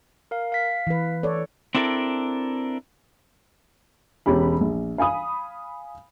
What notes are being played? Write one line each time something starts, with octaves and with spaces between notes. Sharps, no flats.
A#4 F5
F5 B6
E3 B4
A4 C#5 D5
C4 D4 E4 A4 A#4
E1 C#4 G4 B5
A#1
F5 G#5 B5 D#6